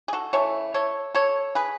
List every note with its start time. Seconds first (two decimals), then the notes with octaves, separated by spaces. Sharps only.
0.08 G#4
0.13 F#4 A4
0.33 C#3 E3 A3 A4 C#5
0.74 A4 C#5
1.15 A4 C#5
1.55 G#4 B4